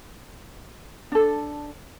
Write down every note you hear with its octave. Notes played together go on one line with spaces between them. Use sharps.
D4 A4